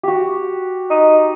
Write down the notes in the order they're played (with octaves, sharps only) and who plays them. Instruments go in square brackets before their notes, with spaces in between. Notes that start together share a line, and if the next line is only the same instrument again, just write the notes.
[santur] F#4 G4
[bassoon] D#4